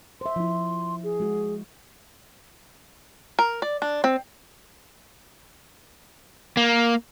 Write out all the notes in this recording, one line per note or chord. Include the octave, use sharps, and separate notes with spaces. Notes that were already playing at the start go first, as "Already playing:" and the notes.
C5 E5 C6
F3 E4
G#4
G#3 F#4
A#4
D5
D4
C4
A#3